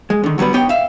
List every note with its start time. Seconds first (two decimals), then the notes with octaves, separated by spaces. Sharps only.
0.10 G#3
0.24 D3 D#3
0.38 D3 F#3 G3 B3 B4
0.54 B3 D#4 G4 C#5 G5
0.69 E5 F5